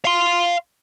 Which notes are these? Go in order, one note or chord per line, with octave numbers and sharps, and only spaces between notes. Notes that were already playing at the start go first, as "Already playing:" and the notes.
F5 C6